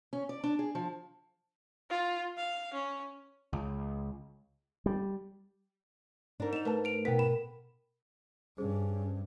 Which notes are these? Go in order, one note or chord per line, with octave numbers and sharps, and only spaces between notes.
C#4
D5
D4
G#4
F3
F4
F5
C#4
C#2
G3
G#2 D4 A#4
D#4 E7 F7
A3 A#4 B4 A5
A#4 D7 F7
B2 B3 A#4 G5 B6
B5 E7
G2 C#4 G#4 C5